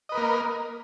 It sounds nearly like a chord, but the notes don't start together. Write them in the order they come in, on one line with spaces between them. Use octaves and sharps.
D#5 B4 A#4 A#3